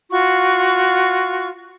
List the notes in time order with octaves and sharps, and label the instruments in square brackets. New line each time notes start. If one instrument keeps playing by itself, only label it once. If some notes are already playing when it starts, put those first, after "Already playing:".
[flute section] F4 F#4 C#6